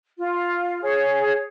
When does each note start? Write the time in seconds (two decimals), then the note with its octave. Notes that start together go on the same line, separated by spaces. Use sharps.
0.18 F4
0.83 G#4 C#5